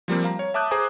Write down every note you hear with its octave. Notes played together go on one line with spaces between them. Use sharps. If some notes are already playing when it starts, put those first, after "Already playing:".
F3 G3 A#3 C4
F5 A#5
C#5
E5 A5 D6 D#6 F#6 G6
G#4 C5 G#5 A#5 D6 D#6